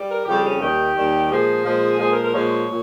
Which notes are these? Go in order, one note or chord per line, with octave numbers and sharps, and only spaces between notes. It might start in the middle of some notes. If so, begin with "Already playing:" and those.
Already playing: G3
A#4
F2 C#3 G3 G4
C#4
D#2 D#3 G3 G4
D#2 D#3 G3
A#2 F3 G#3 G#4
A#2 F3 G#3
A#2 F3 G#3 G#4
A#4
A#4
A#2 F3 G#3 C#5
A#2